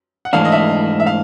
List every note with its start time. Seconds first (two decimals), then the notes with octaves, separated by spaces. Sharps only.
0.25 F#5
0.33 G#2 E3 A3 D4 F5
0.45 D#5
0.52 E5
1.00 E5
1.06 F5